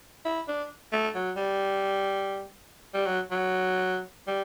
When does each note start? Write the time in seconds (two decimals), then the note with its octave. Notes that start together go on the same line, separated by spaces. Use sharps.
0.25 E4
0.48 D4
0.92 A3
1.15 F#3
1.37 G3
2.94 G3
3.06 F#3
3.31 F#3
4.27 G3